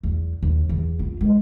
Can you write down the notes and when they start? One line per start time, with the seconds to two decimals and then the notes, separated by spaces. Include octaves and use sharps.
0.03 E2
0.43 D#2
0.69 E2
0.99 F4
1.21 G#3